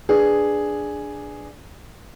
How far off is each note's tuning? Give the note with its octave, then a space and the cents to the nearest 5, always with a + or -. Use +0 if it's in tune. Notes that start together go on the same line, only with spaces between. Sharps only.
D4 +0 G#4 +0 B4 +0